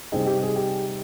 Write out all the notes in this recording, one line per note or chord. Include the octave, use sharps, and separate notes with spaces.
C3 G3 C4 D#4 G#4
G4
G#4
G4